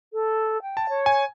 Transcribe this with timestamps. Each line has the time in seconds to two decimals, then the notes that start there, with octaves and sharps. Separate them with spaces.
0.13 A4
0.62 G5
0.77 A5
0.89 C#5
1.06 G#5